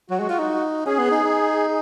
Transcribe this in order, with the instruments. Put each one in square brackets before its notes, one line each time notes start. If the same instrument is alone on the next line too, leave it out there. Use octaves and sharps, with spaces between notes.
[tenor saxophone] F#3 [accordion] F#4
[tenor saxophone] G#3
F4
D#4
[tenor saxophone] C#4 [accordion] G#4
[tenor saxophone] B3
D#4
D#4